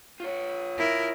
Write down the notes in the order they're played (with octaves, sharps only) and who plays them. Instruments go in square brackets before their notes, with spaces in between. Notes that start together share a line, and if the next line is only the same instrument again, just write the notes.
[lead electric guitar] F4 C#5
[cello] E4 A#4